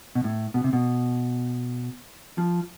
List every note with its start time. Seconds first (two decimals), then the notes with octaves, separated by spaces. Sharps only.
0.15 B2
0.24 A2
0.54 B2
0.64 C3
0.73 B2
2.38 F3